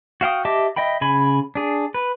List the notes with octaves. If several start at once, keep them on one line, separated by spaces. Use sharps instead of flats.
F#4 F5 G5 D#6
G4 D#5 E5 A5 D6
D#5 E5 G5 B5
C#3 G#5 B5
D4 G#4
B4